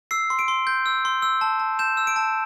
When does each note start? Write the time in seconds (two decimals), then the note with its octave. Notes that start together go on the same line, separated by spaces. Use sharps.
0.11 E6 C7
0.30 C6
0.39 D7
0.48 C6
0.67 G6
0.86 E6
1.05 C6
1.22 E6
1.41 A5
1.60 A5
1.79 G6 E7
1.97 E6
2.07 D7
2.16 A5